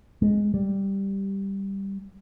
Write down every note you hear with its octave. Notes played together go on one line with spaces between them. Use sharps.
G#3
G3